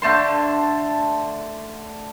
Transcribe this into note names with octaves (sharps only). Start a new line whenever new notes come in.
D3 A3 A5 C6